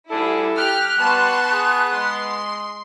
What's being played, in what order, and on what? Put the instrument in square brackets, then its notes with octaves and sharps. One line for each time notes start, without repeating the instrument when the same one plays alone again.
[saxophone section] D2 D4 G#4 [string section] G3 E4 [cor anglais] A4
[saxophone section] G4 [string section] F6 [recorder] F#6
[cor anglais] G3 [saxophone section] B3 [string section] A5 C6 C#6
[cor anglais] G#4
[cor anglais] G#3 [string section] C6